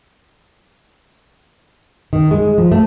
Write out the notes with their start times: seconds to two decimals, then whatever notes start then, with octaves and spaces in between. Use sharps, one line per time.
2.13 D#3
2.31 G#3
2.58 F3
2.72 A3